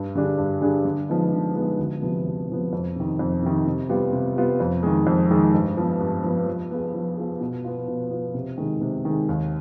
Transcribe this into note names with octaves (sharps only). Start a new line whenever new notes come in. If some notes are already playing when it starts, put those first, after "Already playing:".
Already playing: G2
D3 G3 D4 G#4
G2
D3 G3 D4 G#4
D3
F3 G#3 B3 D#4
D3
F3 G#3 B3 D#4
D2
C3 F3 B3
D2
C3 F3 B3
F2
C3 D#3
F2
C3 D#3
C3
G3 B3 F4
C3
G3 B3 F4
F2
D#3 G#3
F2
D#3 G#3
G2
F3 B3
G2
F3 B3
F3
B3 F4 G#4
F3
B3 F4 G#4
B2
B3 F4
B2
B3 F4
C3
D#3 G#3
C3
D#3 G#3
D#2